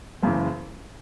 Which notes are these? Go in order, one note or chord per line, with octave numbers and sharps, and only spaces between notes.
F#1 F#2 C#3 E3